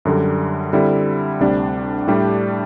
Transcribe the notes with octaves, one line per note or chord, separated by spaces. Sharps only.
F#2 D3 G3
D3 G3 C4 E4
D2 C3 G3 D4
A2 G3 D4 G4